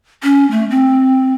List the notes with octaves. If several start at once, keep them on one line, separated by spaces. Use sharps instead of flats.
C#4
A3
C4